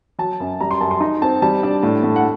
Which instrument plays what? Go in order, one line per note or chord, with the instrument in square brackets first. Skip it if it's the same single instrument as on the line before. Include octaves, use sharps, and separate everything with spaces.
[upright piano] F#3 A5
F#2
G3 A#5
C6
F#2 A5
C6
D#4
C4 A5
G3 A5
D4
A2
A2
F#5